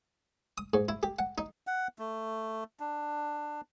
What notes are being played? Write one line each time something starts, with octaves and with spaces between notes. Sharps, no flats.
D#6
G#2
E4
G4
F#5
D#4
F#5
A3
D4